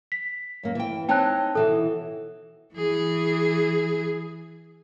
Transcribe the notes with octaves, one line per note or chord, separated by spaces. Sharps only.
B6
F#2 A#3
E3 G5
C4 D#4 C#5 G5 A5 F#6
B2 E3 F#4 A4
E3 G#4